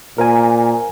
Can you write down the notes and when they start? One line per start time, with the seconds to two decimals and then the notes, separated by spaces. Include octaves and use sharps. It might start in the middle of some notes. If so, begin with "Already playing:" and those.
0.18 A#2 A#4 C5 G#5